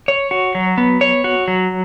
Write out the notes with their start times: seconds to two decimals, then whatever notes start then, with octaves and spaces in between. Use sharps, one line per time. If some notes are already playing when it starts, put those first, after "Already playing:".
0.08 C#5
0.31 F#4
0.55 F#3
0.78 B3
1.01 C#5
1.24 F#4
1.48 F#3